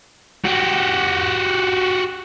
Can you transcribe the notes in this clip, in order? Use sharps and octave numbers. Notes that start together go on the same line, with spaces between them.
F#4 G4